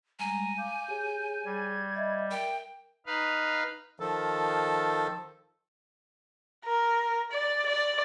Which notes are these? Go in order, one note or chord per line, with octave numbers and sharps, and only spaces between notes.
G3 G#3 G#5 A#5
F5 D6 G6
G4 G#4 C#5
G3 G#6
D#5 E5 B5
A#4 E5 G5
D#4 B4 F5
D#3 F3 A4
A#4
D5
D5